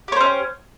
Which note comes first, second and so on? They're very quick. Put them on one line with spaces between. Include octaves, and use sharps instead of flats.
G4 C#5 C5 C#4